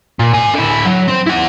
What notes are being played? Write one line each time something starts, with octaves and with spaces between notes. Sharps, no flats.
A#2
A#4 G#5
D3 E4
F#3
C4 C5
E4 F#5